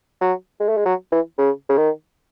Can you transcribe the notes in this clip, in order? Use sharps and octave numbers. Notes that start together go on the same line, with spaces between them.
F#3
G#3
A3
G#3
F#3
E3
C#3
C#3
D#3